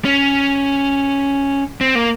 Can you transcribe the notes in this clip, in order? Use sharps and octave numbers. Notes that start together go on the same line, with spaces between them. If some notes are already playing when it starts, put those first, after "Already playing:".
C#4
C4
A#3